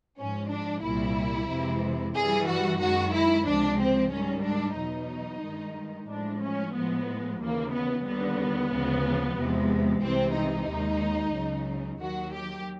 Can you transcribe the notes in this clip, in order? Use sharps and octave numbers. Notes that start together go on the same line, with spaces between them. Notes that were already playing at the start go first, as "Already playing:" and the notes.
G#2 F3 G#3 C#4
D4
C2 A#2 G3 E4
F2 C3 E3 G#3
G2 E3 G3 G#4
F#4
F#2 D#3 G#3 F#4
E4
C#2 C3 F3 G#3 D4
C4
G#2 D#3 G3 C#4
D4
E2 B2 F#3 D#4
G2 D#3 G#3
A2 F3 G#3 D4
C#4
A2 F3 G#3 B3
D#2 C#3 E3 A#3
B3
D#2 D3 G3 B3
D2 C#3 F3 G#3
E2 C3 F3 G#3
C2 C3 E3 G#3 C4
D#4
D#2 D#3 G#3
C#2 C#3 F#3
D#2 D#3 F#3 F#4
G4